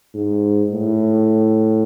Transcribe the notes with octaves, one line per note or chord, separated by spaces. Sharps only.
G#2
A2